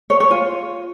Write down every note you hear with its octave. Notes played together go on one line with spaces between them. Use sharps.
C#5
C#5
F4